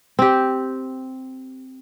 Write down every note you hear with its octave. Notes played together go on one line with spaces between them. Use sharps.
C4 G4